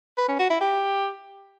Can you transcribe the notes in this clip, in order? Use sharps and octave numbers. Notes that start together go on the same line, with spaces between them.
B4
C#4
F#4
E4
G4